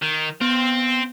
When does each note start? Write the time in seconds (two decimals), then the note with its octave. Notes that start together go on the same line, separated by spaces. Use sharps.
0.02 D#3
0.41 B3 C4